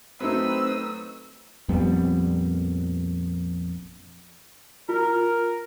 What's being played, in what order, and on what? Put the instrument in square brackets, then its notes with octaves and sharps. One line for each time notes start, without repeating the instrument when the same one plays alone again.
[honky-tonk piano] F#3 A3 D#4 [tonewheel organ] C4 B4 [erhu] E6
[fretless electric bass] A#1 F2 G3 B3
[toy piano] F4 [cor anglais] A#4